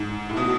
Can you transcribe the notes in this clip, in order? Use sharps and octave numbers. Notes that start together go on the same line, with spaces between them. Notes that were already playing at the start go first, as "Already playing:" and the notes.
Already playing: G#2
A2
B2